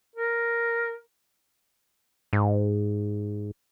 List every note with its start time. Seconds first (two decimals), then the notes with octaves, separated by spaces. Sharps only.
0.16 A#4
2.33 G#2